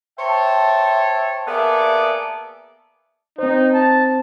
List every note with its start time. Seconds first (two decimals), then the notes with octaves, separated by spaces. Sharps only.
0.19 C5 C#5 E5 G5 A5
1.48 A#3 B3 G#4 A4 D5 E5
3.39 C4 D#4 C5
3.73 A5